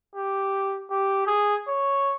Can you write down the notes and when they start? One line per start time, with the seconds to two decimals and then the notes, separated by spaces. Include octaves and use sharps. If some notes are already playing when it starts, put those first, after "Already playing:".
0.15 G4
0.91 G4
1.27 G#4
1.67 C#5